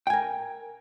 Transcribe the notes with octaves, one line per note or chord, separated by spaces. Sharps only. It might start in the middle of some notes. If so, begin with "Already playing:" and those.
A#4 G5 G#5